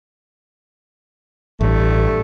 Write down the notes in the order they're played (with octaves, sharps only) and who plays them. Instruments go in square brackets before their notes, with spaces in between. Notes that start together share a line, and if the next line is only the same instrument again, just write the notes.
[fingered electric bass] A1 [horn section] G2 A3